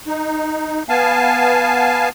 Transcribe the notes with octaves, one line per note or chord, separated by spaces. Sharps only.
D#4
B3 F5 G#5 A5